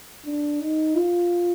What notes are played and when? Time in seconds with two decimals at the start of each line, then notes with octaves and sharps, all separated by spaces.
0.25 D4
0.61 D#4
0.95 F4